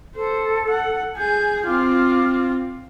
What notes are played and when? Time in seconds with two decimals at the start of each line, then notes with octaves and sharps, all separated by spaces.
0.16 A4 C5
0.68 F#5
1.17 G#4 G#5 G6
1.66 C4 F4 D6 F6